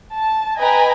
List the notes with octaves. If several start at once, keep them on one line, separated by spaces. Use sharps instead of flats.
A5
B4 D#5 G5 G#5 A#5 B5